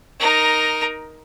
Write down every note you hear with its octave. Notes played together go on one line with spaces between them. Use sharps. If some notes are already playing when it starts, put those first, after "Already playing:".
D#4 A#4